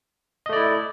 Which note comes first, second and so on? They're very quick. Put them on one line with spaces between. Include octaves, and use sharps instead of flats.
D#5 A3 D5 E4